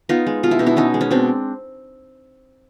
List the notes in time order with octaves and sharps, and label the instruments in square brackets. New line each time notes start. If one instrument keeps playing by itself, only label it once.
[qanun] B3 D#4 F4
G#3
B2 F4
E4
B2 D#4
D4 E4
B3 C#4 D#4
G#3
C#4
B2 C4 D4